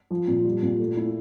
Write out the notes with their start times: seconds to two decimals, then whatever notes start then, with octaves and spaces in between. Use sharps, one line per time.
0.11 F3
0.28 A#2
0.45 G3
0.62 A#2
0.79 A3
0.97 E4